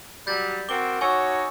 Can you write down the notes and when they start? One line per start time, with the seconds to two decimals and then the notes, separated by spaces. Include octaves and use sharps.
0.27 F#3 G3 G6 A6
0.69 C4 F#4 A#4 D6 G7
1.01 D#4 F#4 C#5 G#5 C#6 E6